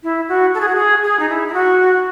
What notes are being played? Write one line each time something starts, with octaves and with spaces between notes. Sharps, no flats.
E4
F#4
A4
G#4
F#4
G#4
G#4
D#4
E4
E4
F#4